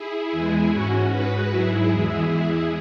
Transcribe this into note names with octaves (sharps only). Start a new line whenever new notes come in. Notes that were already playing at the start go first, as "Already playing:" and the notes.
Already playing: E4 G#4
E2 E3 G#3
G#2 G#3 C#4 F#4
G#2 G#3 F#4 B4
G#2 F#3 E4 G#4
E2 E3 G#3
E2 E3 G#3